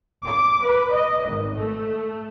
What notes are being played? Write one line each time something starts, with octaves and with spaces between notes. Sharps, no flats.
D6
B4
D#5
G#1
A3